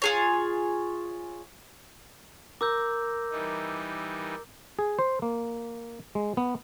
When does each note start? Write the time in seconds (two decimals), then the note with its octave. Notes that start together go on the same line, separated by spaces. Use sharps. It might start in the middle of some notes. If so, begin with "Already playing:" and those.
0.02 F4 G#4 C#5
2.61 A#4 D6 E6 G6
3.31 E3 G3 D#4
4.79 G#4
4.99 C5
5.22 A#3
6.15 G#3
6.37 B3